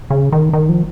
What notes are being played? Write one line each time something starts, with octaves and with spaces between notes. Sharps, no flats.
C#3
D#3
D#3
F3